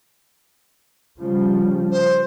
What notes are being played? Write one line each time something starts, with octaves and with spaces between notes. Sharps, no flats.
C#3 F3 G3
C5